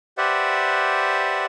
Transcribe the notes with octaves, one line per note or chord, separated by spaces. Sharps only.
G4 B4 C5 D5 E5 F#5